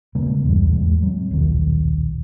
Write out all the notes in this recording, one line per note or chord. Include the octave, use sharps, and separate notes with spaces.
C#3 G#3 A#3 B3
B1 E2 G2
E2 A2 G#3
F#3 C4
D#1 B1 D#3